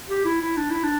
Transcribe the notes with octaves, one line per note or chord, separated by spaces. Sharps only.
G4
E4
E4
D4
E4
D4